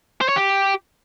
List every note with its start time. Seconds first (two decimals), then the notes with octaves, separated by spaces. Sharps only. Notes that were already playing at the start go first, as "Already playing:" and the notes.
0.21 C5
0.29 C#5
0.36 G4